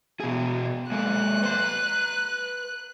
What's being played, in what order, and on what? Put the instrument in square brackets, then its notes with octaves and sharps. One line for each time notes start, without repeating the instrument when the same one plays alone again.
[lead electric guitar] B2 G#4
[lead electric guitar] G#3 A#3 [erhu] F#6
[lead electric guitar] B4 C6